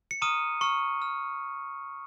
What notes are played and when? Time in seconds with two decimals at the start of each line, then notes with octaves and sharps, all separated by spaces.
0.11 C#7
0.22 A#5 C#6 D#6 F6 D#7
0.61 A#5 C#6 F6 C#7
1.01 A#5 F6